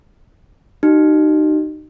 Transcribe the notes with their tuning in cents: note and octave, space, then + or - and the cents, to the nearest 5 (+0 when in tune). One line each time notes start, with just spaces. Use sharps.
D#4 -25 F#4 +45